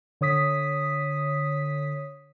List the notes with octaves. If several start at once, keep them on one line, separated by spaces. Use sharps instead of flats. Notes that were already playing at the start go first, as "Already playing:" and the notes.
D3 C#5 D#6 B6